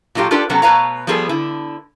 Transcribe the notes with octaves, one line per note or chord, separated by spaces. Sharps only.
A#2 F#3 D#4 F4 G4 A4
D4 F4 G4 A4 B4 D5
C3 F#3 B3 C#4 A4
B2 A3 B4 C#5 F5 A#5
F3 G3 B3 G#4 A4 B4
D3 E4